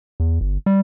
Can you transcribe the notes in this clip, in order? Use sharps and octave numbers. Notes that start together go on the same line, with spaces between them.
E2
G1
G3